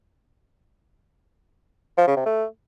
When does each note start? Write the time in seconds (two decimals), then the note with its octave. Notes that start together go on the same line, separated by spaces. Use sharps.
1.98 F3
2.07 C#3
2.17 C3
2.26 A3